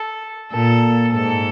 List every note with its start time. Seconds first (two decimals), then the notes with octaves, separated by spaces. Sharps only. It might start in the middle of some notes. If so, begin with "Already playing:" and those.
Already playing: A4
0.52 A#2 A4
1.12 G#2 A4